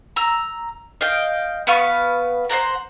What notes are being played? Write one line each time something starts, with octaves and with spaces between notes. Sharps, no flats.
A#5 E6
D#5 F5 G5
B3 B4 F5 C#6
C5 D5 F#5 A#5